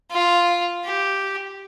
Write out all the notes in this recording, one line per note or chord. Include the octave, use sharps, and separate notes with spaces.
F4
G4